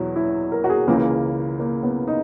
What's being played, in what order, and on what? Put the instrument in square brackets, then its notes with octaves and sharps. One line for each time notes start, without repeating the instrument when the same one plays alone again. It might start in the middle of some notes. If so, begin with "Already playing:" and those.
Already playing: [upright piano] E2 B2 F#3 E4
E4
A#4
F#4
G#4
C#2 C#3 E3 A#3
A#3
B3
D#4